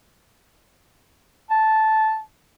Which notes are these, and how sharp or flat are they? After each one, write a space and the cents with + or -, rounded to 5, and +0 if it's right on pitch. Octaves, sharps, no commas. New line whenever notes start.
A5 -10